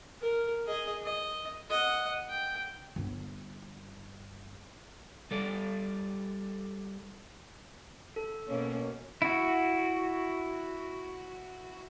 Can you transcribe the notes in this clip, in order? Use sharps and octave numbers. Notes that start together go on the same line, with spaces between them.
A#4
G#4 D#5
D#5
D#5 F#5
G5
G1 G3
G3 A4 D5
A4
B2 A#3 C#4
E4 F#4